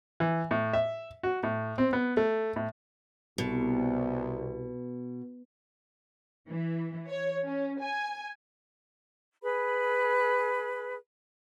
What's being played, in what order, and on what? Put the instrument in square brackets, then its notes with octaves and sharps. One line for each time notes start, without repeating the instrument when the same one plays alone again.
[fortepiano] E3
A2
E5
F#4
A2
C4
B3
A3
A2
[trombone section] C2 [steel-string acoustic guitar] B2
[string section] E3
C#5
C#4
G#5
[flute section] G#4 B4 B5